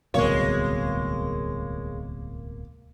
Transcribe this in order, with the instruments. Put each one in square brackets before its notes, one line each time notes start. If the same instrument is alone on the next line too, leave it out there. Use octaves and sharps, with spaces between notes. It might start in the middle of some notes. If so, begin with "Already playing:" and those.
[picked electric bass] D1 C2 B2 [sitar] G#3 C#5 [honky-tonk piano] A#3